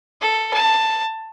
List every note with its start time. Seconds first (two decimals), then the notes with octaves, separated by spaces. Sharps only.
0.21 A4
0.54 A5